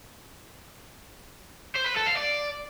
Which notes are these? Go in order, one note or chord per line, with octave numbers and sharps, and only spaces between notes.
C5
B4
A4
F5
D5